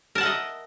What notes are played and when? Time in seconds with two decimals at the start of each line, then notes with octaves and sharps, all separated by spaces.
0.15 A#4
0.18 A5
0.20 F#5
0.23 E5
0.26 D#5